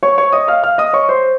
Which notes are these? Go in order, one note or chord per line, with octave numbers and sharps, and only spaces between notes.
C#5 C#6
C#5 C#6
D#5 D#6
F5 F6
F5 F6
D#5 D#6
C#5 C#6
C5 C6